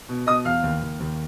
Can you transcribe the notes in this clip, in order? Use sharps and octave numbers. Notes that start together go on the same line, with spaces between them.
B2
B2 D#5 D#6
E2 F5 F6
D#2
D#2
D#2